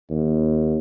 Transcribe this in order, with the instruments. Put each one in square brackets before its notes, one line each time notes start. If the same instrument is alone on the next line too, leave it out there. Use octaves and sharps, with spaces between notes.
[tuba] D#2